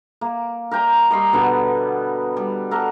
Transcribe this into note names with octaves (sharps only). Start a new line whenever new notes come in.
A#3
A#4 D5 G5 A#5
G3 D#5 C6 C#6
B2 D3 B3
G3
A4 A#4 D5 F#5